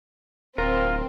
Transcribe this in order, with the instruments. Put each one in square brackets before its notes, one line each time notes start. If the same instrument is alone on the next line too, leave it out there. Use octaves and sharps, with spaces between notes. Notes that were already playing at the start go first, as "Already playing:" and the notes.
[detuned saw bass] D1 [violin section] C4 [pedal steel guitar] F4 [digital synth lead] A#4